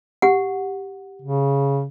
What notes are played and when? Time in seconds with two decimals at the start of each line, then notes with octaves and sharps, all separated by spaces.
0.22 G4 F#5
1.21 C#3